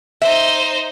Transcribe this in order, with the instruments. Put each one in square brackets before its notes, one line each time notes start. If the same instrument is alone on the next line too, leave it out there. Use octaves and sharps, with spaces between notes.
[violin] D#4 C5 [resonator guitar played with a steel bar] E5